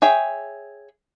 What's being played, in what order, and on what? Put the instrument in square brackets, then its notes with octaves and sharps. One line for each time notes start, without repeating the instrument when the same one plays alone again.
[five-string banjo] G#4 C#5 E5 G5